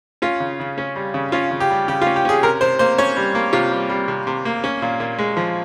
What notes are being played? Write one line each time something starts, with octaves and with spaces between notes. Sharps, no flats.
C#4 F4
C#3
C#3
C#4
G3
C#3
C#4 F4
C#3
G4
G3
C#3 G4
F4
C#4
G4
C#4 G#4
C3 A#4
C3 C5
A#3 C5
C#4 C#5
G3
A#3
C3 F4
G3
G3
C3
C3
A#3
C#4
A#2
A#2
G#3
F3